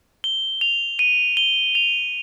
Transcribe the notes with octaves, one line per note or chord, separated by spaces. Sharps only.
G7
F7
D#7
G7
F7